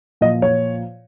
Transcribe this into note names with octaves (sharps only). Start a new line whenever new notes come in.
A#2 F3 D#5
C#5